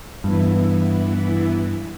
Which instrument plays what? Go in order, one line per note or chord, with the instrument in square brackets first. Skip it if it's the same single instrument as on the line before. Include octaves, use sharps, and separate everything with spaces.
[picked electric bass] G2 [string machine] E3 B3 E4